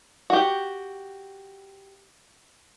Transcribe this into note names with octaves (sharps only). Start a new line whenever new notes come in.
F#4 G4